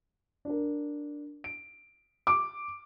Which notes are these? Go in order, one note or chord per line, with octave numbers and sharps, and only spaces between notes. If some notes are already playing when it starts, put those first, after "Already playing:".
D4 A#4
D7
D6